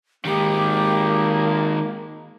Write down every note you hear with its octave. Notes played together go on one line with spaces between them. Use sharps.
D#3 G#3 A#3 G4